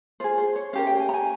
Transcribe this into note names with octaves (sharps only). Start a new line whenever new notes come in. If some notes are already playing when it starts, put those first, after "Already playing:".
F4 G#4 C5
C5
C#5
C#4 G4 A#4 F5
G5
G#5
A#5
G#5